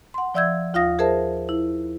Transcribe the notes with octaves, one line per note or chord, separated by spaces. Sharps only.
F#5 C6
F3 D5 E5 E6 G6 G#6
D#2 F4 F5 D#6 A#6
G#4 A#4 C5 E5 A5
E4